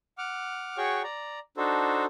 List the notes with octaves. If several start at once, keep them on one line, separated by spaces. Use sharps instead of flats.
F#5 D6 F6
F#4 G#4 C#5 F#5 G5 C#6
D5 A#5
D4 D#4 F#4 A4 C5